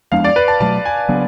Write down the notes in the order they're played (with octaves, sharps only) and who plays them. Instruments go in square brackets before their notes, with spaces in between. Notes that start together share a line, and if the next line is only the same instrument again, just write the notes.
[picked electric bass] F3 G#3 B3 D4 [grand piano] F5
[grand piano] D5
B4
A5
[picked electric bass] B2 F#3 A3 [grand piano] A5
[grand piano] G#5
[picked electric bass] C#3 F#3 B3 D4